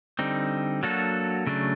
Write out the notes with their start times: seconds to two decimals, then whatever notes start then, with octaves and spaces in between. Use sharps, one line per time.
0.19 D3 G3 C4 D#4
0.83 F#3 A#3 D4 F#4 A4
1.47 C#3 F#3 A3 D4